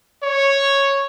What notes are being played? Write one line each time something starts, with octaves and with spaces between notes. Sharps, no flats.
C#5